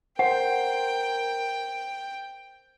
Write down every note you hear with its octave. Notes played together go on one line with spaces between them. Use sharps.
A#4 C5 F#5 G5